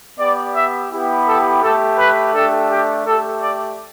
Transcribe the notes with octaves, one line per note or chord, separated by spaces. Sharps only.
B3 G4 D5
E5
B3 E4 G4
A4
A3 G4 A4
B4
A3 D4 G4 A4
G4
A3 G4 A4
D5